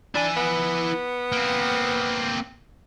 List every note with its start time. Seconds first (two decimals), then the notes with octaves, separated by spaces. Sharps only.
0.15 D4 E4 G#5
0.37 B3
1.32 A#3 C4